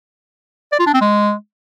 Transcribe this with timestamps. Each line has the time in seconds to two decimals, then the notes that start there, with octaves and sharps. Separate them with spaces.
0.72 D5
0.79 F4
0.87 D4
0.94 C4
1.01 G#3